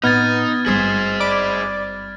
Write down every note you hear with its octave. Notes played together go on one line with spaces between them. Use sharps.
A2 B3 C4 D#4 F6 G#6 A6
G#1 G2 G#4 C5
D5 B5 D6